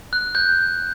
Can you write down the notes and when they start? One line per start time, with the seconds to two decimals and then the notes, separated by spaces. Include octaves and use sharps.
0.13 F#6
0.35 G6